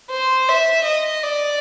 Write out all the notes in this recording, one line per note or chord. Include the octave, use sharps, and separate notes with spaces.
C5
E5
D#5
D5